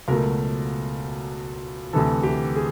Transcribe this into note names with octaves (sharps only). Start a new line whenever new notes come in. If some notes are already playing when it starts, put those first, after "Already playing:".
C#2 B2 F#3 A3 A#4
D2 C3 E3 A4
G4
G#4